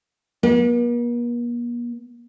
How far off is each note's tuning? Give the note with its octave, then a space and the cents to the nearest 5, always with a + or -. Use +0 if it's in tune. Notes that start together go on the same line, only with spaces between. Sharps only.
A#3 +45